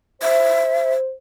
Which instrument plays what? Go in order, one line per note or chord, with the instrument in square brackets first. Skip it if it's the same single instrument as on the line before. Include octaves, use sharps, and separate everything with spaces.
[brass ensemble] C5 [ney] E5